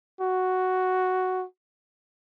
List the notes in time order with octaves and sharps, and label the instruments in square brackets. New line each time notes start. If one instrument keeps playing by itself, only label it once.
[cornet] F#4